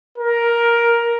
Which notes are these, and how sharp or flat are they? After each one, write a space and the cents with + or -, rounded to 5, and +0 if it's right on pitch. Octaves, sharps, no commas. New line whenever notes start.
A#4 +10